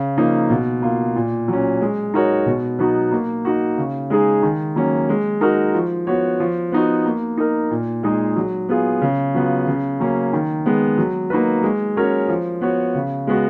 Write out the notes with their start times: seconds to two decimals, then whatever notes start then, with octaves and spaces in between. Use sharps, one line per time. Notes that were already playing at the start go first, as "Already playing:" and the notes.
Already playing: C#3
0.17 F3 A#3 D#4
0.50 B2
0.82 A#3 F4
1.16 A#2
1.48 F#3 C#4
1.81 G#3
2.14 D#4 F#4 A#4 C#5
2.46 B2
2.79 F#3 B3 D#4 F#4
3.12 A#3
3.45 D#4 F#4
3.78 C#3
4.10 G#3 D#4 G#4
4.42 D#3
4.76 F#3 A#3 C#4
5.09 G#3
5.41 D#4 F#4 A#4
5.74 F3
6.07 B3 F#4 C#5
6.40 F3
6.72 B3 D#4 F#4
7.06 A#3
7.37 D#4 A#4
7.71 A#2
8.03 G#3 D#4 G#4
8.36 F#3
8.69 B3 F4 G#4
9.01 C#3
9.34 F#3 B3 F4
9.67 C#3
10.00 F#3 A#3 C#4
10.33 D#3
10.66 G#3 B3
10.98 F#3
11.30 A#3 D#4 F#4 B4
11.63 G#3
11.96 C#4 F#4 A#4 C#5
12.28 F3
12.61 B3 F#4 C#5
12.95 C#3
13.27 G#3 B3 F#4